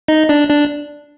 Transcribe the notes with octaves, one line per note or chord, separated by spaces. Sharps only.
D#4 D#5
D4 D5
D4 D5